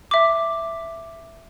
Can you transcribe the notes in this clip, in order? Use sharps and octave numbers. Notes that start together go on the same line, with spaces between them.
E5 D6